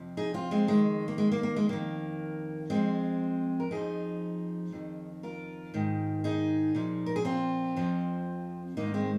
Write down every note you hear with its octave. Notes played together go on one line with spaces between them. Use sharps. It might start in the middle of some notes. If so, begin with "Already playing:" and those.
Already playing: F2 C3 F3
D#4 G#4
C4 F4
G#3 C4
F2 D#3 G#3
A#3
G#3
A#3
A#3
G#3
F2 D#3 A#3
F2 F3 G#3 C4
A#4
F2 F3 D#4 G#4
F2 D#3
F4 A#4
G#2 D#3
D#4 G#4
A#2 F3
A#4
G#4
C4 F4
F2 F3
G#2 D#3 A#3 D#4
G#3 C4